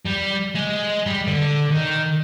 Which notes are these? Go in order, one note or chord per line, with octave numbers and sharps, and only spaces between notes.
G3
G#3
G3
D3
D#3